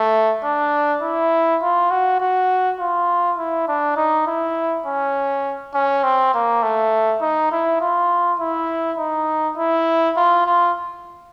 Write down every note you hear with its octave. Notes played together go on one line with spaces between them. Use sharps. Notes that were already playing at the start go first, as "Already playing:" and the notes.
Already playing: A3
D4
E4
F4
F#4
F#4
F4
E4
D4
D#4
E4
C#4
C#4
C4
A#3
A3
D#4
E4
F4
E4
D#4
E4
F4
F4